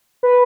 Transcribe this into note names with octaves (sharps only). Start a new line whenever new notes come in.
B4